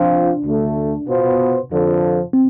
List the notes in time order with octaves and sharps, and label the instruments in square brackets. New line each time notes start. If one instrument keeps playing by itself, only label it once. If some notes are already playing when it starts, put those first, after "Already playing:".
Already playing: [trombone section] F3 C4 F4 [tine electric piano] D4
[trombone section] D2 D3 A3
B2 B3 F4 C5
F2 D3 F3
[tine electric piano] C4